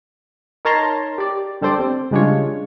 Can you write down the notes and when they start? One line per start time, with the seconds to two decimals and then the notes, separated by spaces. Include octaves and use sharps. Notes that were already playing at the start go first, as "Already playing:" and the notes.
0.65 D#4 A#4 C#5 A5 A#5 C6
1.18 G4 D5
1.61 D3 G3 A4 C5 D5
1.79 C4
2.11 C#3 G3 G#3 D4 F4 C#5